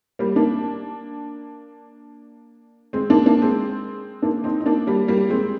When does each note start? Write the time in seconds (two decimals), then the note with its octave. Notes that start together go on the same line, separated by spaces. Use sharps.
0.19 G3 A#3
0.36 A#3 D4
2.93 G#3 C4
3.10 A#3 D4
3.26 A#3 D4
3.42 G#3 C4
4.22 A#3 D4
4.44 C4 D#4
4.60 D#4
4.66 A#3 D4
4.87 G3 A#3
5.08 G3 A#3
5.30 G#3 C4